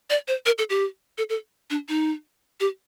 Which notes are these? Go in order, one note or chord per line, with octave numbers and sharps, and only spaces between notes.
D5
C5
A#4
A4
G4
A4
A4
D4
D#4
G4